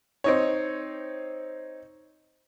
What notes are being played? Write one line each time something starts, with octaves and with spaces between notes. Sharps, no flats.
C4 D#4 C#5